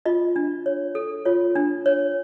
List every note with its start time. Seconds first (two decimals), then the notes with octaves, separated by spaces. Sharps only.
0.05 F4 D#5
0.36 D4
0.66 C#5
0.95 A4
1.25 F4 C#5
1.55 D4
1.86 C#5